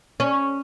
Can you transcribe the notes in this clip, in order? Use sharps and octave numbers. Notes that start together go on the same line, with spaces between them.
C#4